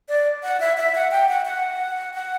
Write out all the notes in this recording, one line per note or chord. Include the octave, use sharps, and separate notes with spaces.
D5
F#5
E5
E5
F#5
G5
F#5
F#5
F#5